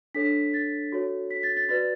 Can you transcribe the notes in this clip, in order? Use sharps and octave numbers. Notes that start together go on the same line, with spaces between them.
D4 A4 C#5 B6
A6
F#4 A4 C#5
B6
A6
A6
F#4 B4 D5 A6